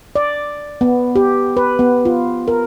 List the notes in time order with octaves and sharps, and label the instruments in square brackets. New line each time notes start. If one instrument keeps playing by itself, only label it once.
[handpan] D5
B3
G4
B4
B3
F4
A#4